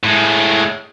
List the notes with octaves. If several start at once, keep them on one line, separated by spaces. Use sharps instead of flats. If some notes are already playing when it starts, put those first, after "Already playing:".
A2 G#3